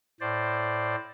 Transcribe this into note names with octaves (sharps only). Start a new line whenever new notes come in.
A2 C5 D5